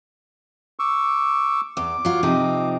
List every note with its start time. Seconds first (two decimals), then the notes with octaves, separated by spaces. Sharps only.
0.79 C#6 D6 E6
1.77 E2 D6
2.05 F#3 F4
2.23 C3 F3 D#4